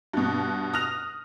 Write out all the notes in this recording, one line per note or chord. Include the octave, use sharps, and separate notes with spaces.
G2 B2
D#6 F6 F#6 A#6 F7